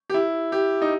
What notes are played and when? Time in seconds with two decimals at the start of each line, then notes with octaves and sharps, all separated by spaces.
0.10 G4
0.14 E4
0.52 G4
0.82 D#4